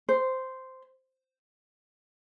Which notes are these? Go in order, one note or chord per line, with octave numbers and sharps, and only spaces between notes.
C5